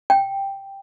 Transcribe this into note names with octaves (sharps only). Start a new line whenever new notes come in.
G5